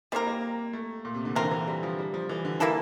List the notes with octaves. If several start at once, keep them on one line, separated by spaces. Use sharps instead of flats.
G3 A#3 C4 G4 A#4
A#3
A3
A#2
C3
D3
E3 A3 C4 F4 A#4
D3
E3
G3
F3
G3
F3
E3
D3
D3 E3 A#3 E4 A4